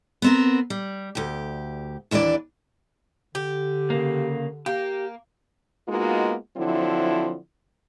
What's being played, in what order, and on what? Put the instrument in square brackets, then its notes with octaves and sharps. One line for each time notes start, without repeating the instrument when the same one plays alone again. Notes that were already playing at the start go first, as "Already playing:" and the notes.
[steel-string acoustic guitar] B3 C4 A#4
G3
D2 G4
D#2 E3 D4 G#4 D5
[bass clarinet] D3 [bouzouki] G4
[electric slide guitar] C#3 A#3
[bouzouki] A#3 [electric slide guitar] G4
[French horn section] G#3 A#3 B3 D#4 F4 F#4
D3 F3 F#3 C4 E4